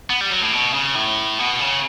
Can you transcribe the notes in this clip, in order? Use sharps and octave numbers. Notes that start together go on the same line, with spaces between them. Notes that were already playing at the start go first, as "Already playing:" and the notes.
B3
G3
F#3
A2
B2
C#3
A2
B2
C#3